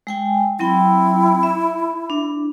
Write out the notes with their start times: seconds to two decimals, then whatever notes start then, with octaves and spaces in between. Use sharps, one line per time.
0.07 G#3 G5 G#5
0.59 F#3 C4 E4 G5
1.43 E5
2.10 D4